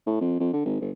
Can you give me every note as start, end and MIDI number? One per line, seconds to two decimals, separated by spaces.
0.06 0.18 45
0.21 0.40 41
0.40 0.48 41
0.53 0.61 50
0.65 0.78 32
0.81 0.91 31